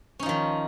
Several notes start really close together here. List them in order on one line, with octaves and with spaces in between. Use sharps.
C#4 D#4 F3 D#3